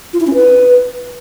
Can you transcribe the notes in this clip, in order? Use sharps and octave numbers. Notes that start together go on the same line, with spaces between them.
F4
E4
C#4
B4